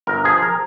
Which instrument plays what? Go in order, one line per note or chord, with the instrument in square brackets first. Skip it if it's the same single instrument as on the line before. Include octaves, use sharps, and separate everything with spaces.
[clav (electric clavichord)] G1 A#4
F3 G#4
A#4